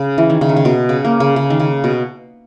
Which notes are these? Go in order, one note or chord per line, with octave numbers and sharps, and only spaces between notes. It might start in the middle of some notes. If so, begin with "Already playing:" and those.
Already playing: C#3
E3
D#3
C#3
D#3
C#3
B2
C#3
A#3
C#3
C#3
D#3
C#3
B2